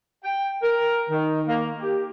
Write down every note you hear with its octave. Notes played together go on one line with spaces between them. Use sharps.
G5
A#4
D#3
A#3
G4